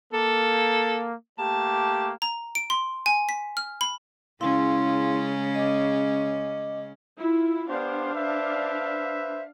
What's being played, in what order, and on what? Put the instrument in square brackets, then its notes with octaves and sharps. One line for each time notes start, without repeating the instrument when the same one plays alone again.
[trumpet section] A#3 [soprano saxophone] A4
[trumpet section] A3 A#3 G4 [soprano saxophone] A5
[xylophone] A#5
D7
C6
G#5
B6
F6
B5
[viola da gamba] C#3 G#3 C#4 [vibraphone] E4 F5 C6
[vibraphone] D#5 D6
[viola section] E4 F4
[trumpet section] B3 G4 C5 [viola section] D4 F5
[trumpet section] B4 C5 E5